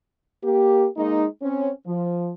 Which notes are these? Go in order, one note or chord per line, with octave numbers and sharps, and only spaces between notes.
A#3 G4
G#3 A#3 D#4
C4 C#4
F3